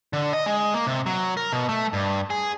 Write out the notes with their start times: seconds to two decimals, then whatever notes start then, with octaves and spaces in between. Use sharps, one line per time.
0.13 D3
0.33 D#5
0.46 G#3
0.74 A#3
0.87 C3
1.06 F#3
1.37 A#4
1.53 B2
1.69 A3
1.93 G2
2.30 G#4